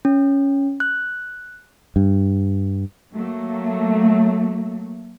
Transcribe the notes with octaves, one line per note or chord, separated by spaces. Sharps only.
C#4
F#6
G2
F#3 A3 A#3